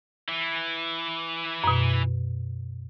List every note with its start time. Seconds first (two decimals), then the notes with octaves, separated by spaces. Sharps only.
0.29 E3
1.64 F#2 B2